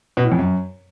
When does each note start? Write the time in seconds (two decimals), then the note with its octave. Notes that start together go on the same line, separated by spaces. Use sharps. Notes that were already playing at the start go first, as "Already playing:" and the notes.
0.17 B2
0.24 A2
0.32 F2
0.39 F#2